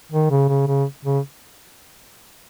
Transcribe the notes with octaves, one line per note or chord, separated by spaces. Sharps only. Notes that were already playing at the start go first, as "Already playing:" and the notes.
D#3
C#3
C#3
C#3
C#3